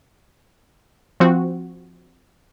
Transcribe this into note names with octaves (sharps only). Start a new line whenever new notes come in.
F3 C4 F#4